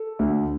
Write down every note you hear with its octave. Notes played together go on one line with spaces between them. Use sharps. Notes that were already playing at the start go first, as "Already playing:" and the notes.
Already playing: A4
D2